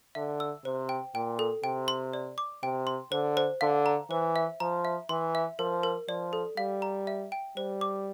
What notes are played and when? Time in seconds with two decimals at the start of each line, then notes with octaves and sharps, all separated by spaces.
0.15 D3 E5
0.40 E6
0.64 C3 C5
0.89 G5
1.15 A#2 G5
1.39 A4
1.64 C3 G5
1.88 C6
2.13 D5
2.38 D6
2.63 C3 G5
2.87 C6
3.12 D3 C5
3.37 C5
3.61 D3 F5
3.86 A#5
4.10 E3 C5
4.36 E5
4.60 F3 A#5
4.85 E5
5.09 E3 C6
5.35 E5
5.59 F3 A#4
5.83 A#4
6.08 F3 D5
6.33 A4
6.57 G3 F5
6.82 A#5
7.07 E5
7.32 G5
7.56 G3 C5
7.81 D6